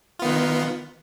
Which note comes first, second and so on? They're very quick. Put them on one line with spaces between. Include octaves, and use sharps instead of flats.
F4 B3 D#3